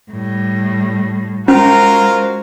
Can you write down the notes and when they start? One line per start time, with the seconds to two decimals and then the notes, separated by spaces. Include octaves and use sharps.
0.11 A2 G3
1.48 G#3 C#4 F4 F#4 A#4 C5